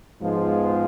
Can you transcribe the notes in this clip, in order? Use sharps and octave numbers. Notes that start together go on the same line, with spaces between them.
G#2 F3 G#3 B3 F4